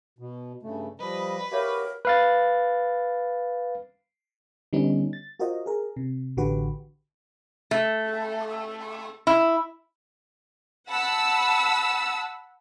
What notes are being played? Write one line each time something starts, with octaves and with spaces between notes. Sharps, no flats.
B2
G2 C#3 A3
F3 G3 B4 D#5
F#4 G4 A#4 C#5 E5 F5
B4 F5 A6
D3 G3 B3 C#4 D#4
A6
F4 F#4 A#4 C5 D#5
G#4 A#4
C3
A1 D3 F#4 G4 B4
A3
E4
F#5 A5 B5 E6